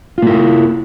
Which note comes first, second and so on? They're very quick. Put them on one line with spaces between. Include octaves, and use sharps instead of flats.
F4 A#3 E4